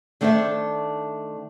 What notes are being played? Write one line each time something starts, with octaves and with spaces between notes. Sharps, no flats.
D#3 A3 D4 C5 D#5 E5